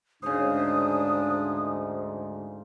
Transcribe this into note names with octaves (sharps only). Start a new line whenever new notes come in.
D2 G#2 C#3 D4 C5 D#6